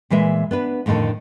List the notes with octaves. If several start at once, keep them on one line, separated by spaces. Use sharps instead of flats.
A#2 E3 G#3 E5
B3 D4 B4
F2 A2 D3 D#3 A4